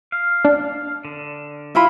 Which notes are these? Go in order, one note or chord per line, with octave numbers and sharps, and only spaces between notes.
F5
D4
D3
E4 F4 B5